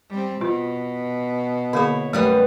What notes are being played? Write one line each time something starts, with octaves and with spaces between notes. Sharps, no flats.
G3 C4
B2 F4
D3 A#3 E4 G#4 C#5
F#2 G3 A3 B3